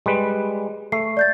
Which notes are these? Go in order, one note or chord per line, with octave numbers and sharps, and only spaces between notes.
G3 G#3 B4
A3 C7
D5 G6 A6